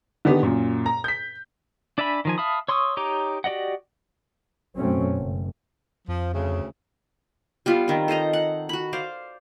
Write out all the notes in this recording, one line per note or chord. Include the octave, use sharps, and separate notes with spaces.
D3 D#3 B3 G4
F#2 A#2
A#5
G6 B6
D4 D5 E5 G#5 B5
D#3 F3 G#5
E5 F5 A5 B5 D#6
C#5 C6 C#6 D#6 E6
D#4 G4 C#5 A#5 D6
F#4 G4 D5 D#5 F#5
F#2 B2 F#3 A3 C4 C#4
F#1
F2 F3
D2 C#3
G3 B3 F4
D#3 C4
A4 C5 D#5 A#5
F#5
F#4 B5
C5 D5 F5